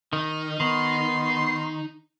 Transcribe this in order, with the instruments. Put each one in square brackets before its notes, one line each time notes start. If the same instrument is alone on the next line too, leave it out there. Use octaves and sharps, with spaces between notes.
[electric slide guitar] D#3 [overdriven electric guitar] D#4
[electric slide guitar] D#3 [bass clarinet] B3 [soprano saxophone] C6